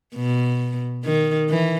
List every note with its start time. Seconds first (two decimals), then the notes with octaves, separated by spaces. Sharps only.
0.15 B2
1.05 D#3
1.49 E3